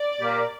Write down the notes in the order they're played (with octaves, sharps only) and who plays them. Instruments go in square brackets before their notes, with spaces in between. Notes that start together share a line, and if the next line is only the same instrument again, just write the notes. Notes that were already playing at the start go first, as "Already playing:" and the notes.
Already playing: [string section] D5
[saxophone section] A#2 A#3 G4 A#4